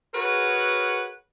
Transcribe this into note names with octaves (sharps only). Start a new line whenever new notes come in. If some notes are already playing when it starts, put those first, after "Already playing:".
F#4 G#4 A#4 B4 C#5 F#5